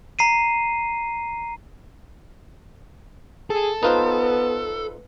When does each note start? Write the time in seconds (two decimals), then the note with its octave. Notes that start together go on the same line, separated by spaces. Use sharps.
0.19 A#5 C7 D#7
3.50 G#4 A4
3.83 B3 D#4 F4 B4 C5